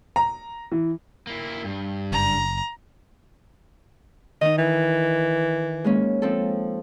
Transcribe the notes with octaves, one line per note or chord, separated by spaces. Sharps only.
A#5
E3
A#3 E4
G2
F#1 A#5
D#3 D#4 D#5
E3
G#3 A#3 C#4
F3 C4 A4